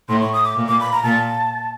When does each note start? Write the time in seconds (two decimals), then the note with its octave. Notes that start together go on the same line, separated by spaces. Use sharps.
0.09 A2 C6
0.21 C#6
0.33 D#6
0.44 D6
0.56 A#2
0.68 D6
0.80 B5
0.92 A#5
1.03 A#2 A5